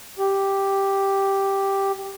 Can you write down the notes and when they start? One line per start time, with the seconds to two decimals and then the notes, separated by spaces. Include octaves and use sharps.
0.19 G4